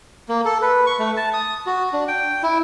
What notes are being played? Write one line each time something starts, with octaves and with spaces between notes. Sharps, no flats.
A#3
A4
B4
C#6
A3
A5
D#6
F#4
D4
G5
E4